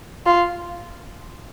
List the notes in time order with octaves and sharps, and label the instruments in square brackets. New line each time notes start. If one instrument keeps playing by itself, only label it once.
[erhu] F4